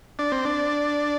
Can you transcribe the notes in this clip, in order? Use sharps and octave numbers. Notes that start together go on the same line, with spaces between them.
D4
C4
D4